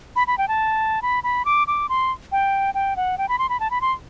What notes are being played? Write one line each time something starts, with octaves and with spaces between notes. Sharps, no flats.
B5
B5
G5
A5
B5
B5
D6
D6
C6
G5
G5
F#5
G5
B5
C6
B5
A5
B5
C6